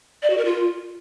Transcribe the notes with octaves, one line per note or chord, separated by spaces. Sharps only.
D5
F#4
A#4
F4